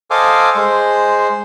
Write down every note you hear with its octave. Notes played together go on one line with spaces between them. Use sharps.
A4 C5 D#5 F5 G#5 D6
G#3 C5